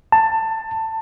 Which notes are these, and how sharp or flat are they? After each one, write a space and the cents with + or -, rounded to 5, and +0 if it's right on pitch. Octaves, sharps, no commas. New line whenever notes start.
A5 +20